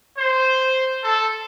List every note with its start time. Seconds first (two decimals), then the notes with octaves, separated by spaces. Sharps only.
0.18 C5
1.03 A4